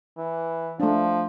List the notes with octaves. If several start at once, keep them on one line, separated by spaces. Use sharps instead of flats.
E3
F3 A3 D4